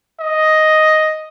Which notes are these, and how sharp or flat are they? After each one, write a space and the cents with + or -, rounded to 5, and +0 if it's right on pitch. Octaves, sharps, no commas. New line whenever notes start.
D#5 +5